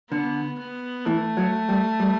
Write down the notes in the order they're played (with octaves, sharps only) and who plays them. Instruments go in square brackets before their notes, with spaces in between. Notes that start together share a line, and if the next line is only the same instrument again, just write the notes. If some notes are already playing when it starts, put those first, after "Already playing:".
[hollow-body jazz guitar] D3 [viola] B3
[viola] B3
[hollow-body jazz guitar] E3 [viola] A3
[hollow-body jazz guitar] F#3
G3
G3